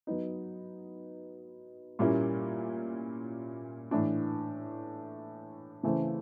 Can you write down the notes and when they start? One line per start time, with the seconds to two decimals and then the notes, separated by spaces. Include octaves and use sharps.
0.07 F#3 B3 D#4
1.99 A#2 G3 A#3 C#4 E4
3.91 A2 E3 A3 D4
5.83 C#3 E3 A3 C4